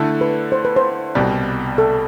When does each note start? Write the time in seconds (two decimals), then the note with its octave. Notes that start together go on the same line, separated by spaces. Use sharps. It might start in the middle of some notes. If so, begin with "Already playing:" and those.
Already playing: D3 A3 E4
0.21 B4
0.52 C5
0.65 B4
0.76 C5
1.15 C2 B2 G3
1.78 A4